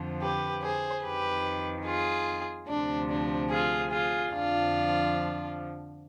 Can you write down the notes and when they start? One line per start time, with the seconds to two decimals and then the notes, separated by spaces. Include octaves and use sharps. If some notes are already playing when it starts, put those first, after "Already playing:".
Already playing: F2 D3 F3
0.21 G4 B4
0.63 G#4 C5
1.04 F2 D#3 G4 B4
1.86 F4 G#4
2.68 D2 C3 F3 D4
3.10 D4
3.50 F4 G#4
3.91 F4 G#4
4.32 F2 D3 F3 D4 F4